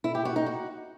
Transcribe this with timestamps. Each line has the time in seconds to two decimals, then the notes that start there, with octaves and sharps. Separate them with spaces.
0.04 E4
0.15 G4
0.25 F#4
0.36 D#4
0.46 F#4